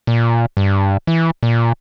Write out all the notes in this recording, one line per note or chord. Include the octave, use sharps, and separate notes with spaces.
A#2
G2
E3
A#2